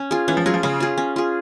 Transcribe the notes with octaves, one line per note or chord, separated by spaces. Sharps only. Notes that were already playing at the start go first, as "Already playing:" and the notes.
Already playing: C#4
F4 G#4
E3 C#4
F3
F#3 F4 G#4
F3
C#3 C#4
F4 G#4
C#4
F4 G#4